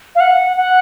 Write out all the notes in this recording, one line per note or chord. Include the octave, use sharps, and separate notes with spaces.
F5
F#5
F#5